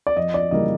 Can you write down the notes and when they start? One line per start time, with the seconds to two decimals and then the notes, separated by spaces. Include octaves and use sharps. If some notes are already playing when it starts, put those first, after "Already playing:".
0.07 D5
0.16 F2 D#5
0.34 D5
0.51 C#3 E3 G3 A#3 D#5